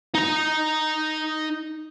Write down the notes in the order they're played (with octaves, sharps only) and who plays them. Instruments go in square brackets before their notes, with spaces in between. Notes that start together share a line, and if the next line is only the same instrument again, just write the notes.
[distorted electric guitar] D#4 A#5